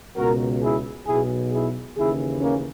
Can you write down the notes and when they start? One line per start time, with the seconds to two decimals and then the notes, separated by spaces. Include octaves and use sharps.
0.16 C#2 B2 F#4 A#4
0.61 E4 G#4
1.06 B1 B2 E4 G#4
1.51 E4 G#4
1.96 D#2 C#3 E3 E4 G#4
2.41 A#3 C#4